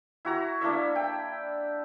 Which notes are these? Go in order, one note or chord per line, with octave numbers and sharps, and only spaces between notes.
E4 F#4 A#5
A#3 D4 E4 E5
G5